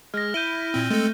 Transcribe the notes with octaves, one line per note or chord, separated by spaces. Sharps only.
G#3 F6 A#6
E4 G6 D#7 G7
A#2 C4
G#3 A3 C4 A4